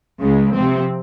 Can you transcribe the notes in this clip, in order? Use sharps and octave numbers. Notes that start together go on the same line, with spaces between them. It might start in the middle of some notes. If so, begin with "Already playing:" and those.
C#2 C#3 G#3
C3 F3 C4